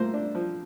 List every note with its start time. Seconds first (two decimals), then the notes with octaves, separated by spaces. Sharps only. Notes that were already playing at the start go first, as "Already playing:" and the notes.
Already playing: A2 A#3 C5
0.14 D4
0.35 F3